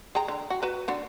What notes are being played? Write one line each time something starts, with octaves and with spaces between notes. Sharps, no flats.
G#4 G5 A#5
D3
F#4
F#4 B4 A#5
D3 D4 F#4